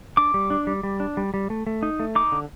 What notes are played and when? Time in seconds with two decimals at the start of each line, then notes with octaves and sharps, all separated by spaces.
0.17 D4 D6
0.34 G3
0.50 D4
0.67 G3
0.83 G3
1.00 D4
1.17 G3
1.34 G3
1.50 A3
1.67 A3
1.83 D#4
2.00 A3
2.15 D#4 D6
2.32 D3